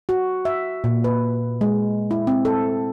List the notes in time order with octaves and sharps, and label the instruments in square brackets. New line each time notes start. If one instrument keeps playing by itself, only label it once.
[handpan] F#4
E5
A#2
B4
G#3
E4
C4
A4